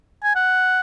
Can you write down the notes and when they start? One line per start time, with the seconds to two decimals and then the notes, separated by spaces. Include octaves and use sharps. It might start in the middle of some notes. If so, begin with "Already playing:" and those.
0.24 G#5
0.36 F#5